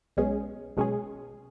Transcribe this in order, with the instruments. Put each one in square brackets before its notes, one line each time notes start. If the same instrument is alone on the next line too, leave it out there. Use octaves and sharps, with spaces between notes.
[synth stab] B1 B2 G#3 C#4 G#4
B1 B2 G#3 C#4 G#4